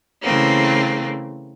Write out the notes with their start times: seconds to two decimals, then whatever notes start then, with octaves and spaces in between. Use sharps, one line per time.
0.21 C#3 E3 A3 A#3 C4